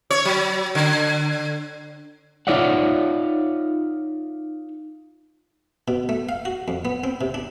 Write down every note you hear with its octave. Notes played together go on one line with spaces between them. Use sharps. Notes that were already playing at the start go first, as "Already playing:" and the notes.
C#5
F#3
D3
D#4 F4 C#5 D5 E5 F#5
B2
A3
F5
F#4
F2
B3
C4
C3
D4